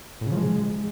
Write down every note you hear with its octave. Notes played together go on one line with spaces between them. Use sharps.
A2
C#3
F3
G#3